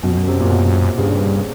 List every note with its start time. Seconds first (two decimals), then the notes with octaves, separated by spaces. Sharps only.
0.03 F#2 B2
0.10 F2
0.17 F#2
0.28 C3
0.40 A#2
0.50 B2
0.74 C3
0.98 G2 C#3